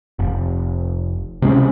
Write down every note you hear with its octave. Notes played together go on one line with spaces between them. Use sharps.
F1
C3 G#3 B3 C#4